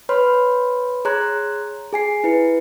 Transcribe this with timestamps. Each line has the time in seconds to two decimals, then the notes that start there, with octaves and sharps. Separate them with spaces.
0.09 B4 C#5 B5 C6 F6
1.05 G#4 C#5 A#5 C6 F#6 G#6
1.92 G#4 G#5 C7
2.24 E4 B4 C#7